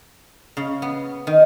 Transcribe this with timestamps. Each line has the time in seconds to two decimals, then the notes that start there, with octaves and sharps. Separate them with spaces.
0.57 C#3
0.82 B3
1.27 D#3